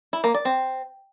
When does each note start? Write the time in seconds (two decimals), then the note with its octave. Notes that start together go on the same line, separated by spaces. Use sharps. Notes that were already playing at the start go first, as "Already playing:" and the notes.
0.13 E4
0.24 A#3
0.34 D5
0.45 C4